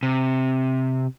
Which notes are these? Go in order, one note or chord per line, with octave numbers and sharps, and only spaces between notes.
C3